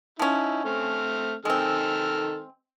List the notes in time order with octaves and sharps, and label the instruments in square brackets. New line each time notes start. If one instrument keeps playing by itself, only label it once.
[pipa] F3 C#4 [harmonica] D#4 E4
[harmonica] A3 C4 F6
[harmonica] D#3 A4 F6 [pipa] G#3 C4